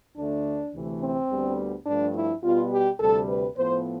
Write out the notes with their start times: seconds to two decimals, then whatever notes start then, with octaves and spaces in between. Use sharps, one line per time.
0.16 D2 D3 A3 D4
0.73 D2 C3 E3 A3
1.01 C4
1.30 D2 D3 G3 B3
1.86 G2 F3 A3 D4
2.15 E4
2.43 B2 G3 B3 F4
2.72 G4
3.00 D2 C3 G3 A4
3.28 B4
3.56 A2 F3 B3 C5